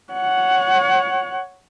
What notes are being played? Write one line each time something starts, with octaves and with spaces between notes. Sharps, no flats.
C#5 F#5